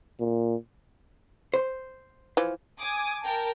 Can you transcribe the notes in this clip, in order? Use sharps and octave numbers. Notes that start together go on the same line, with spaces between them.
A#2
C5
E3 F3
G#5 D6 D#6
A#4 G5 A5